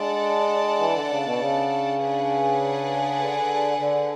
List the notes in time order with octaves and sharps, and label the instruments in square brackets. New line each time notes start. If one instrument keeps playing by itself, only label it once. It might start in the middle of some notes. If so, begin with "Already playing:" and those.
Already playing: [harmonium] G#3 [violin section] D4 A4 D5 F#5 A5
[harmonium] E3
D3
C#3
B2
C#3
[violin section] D4 G#4 B4 D5 F#5
[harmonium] D3
D3